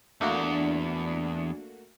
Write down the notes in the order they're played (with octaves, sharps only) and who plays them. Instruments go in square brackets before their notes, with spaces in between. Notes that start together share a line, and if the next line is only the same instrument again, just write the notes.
[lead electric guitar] E2 [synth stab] A3 A#3 F#4 [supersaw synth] D4